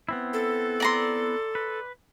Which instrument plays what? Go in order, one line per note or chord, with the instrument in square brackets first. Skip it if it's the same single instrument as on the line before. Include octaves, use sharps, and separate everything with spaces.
[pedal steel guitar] B3 C4 E4
[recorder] A4
[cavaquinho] D5 A#5 C6
[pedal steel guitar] B4